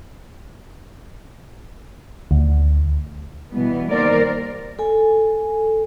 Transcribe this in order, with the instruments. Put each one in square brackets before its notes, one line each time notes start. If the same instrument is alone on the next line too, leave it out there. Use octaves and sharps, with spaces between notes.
[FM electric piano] D2
[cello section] B2 E3 G3 B3
D#3 G3 A#3 A#4 C5 D5
[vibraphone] A4 G#5